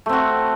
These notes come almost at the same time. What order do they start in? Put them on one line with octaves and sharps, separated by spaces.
A3 C4 F#4